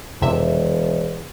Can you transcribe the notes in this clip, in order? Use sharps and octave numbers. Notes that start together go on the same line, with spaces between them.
E1 F2 C3 E5